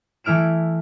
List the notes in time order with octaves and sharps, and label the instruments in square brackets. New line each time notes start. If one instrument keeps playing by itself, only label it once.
[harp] E3 A3 E4 F6 D7 E7